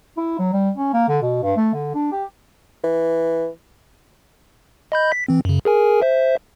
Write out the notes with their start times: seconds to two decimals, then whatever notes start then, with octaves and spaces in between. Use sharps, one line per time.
0.17 E4
0.39 F#3
0.53 G3
0.77 C#4
0.93 A#3
1.08 D3
1.22 B2
1.43 G2
1.57 A3
1.74 D3
1.95 D4
2.12 G4
2.84 E3
4.92 D#5 B5 G6
5.12 B6
5.28 E3 C4
5.45 F#2 C#3
5.65 G#4 A#4 G#5
6.02 C5 E5